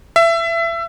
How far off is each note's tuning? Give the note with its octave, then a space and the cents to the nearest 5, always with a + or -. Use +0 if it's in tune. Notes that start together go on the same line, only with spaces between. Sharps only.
E5 +25